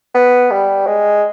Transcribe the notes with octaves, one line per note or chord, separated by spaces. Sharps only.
B3
G3
G#3